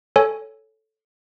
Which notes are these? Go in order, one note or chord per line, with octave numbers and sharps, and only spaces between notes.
A4 C#5 G#5